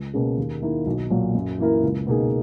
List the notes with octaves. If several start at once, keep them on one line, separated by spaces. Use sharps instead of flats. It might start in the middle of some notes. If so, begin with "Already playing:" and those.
Already playing: C#2
B2 A#3 C#4 G#4
D#2
D#3 A#3 E4
B1
A#2 F#3
F#2
E3 A#3 E4 A#4
C#2
B2 A#3 D#4 G#4